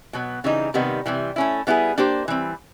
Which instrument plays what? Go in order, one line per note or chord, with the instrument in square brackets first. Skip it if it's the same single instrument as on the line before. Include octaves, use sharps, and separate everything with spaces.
[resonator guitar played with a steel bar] B2 F#3 B3
C#3 E3 G3 C4 D#4
C3 D#3 G3 B3 D#4
C3 E3 G3
A3 C#4 E4
G3 B3 E4 G#4
A#3 D4 G4 C5
E3 G3 C4